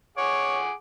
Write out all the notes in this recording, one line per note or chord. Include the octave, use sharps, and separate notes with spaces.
G#4 C#5 F#5 D6